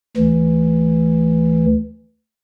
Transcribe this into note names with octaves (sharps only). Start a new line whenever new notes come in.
D2 E3